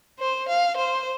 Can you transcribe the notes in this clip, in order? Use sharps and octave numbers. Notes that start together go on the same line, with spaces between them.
C5
F5
C5